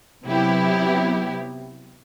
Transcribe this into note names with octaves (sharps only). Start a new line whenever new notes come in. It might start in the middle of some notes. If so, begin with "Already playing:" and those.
C3 F#3 B3 E4 G4